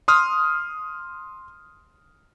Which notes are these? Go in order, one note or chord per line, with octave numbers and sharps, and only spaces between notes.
C6 D#6 F6